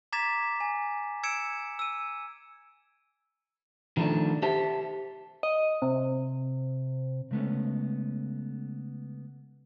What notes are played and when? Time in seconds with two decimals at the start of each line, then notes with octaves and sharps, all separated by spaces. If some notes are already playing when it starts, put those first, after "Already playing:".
0.12 A#5 D6 G#6 A6 B6 E7
0.60 G#5
1.23 E6 G#6 C#7 D7 E7
1.79 E6 D#7
3.97 D#3 F3 A3 C#4 D4
4.42 G4 C5 E5 A5
5.43 D#5
5.82 C3
7.31 C#3 G#3 A3 B3 C#4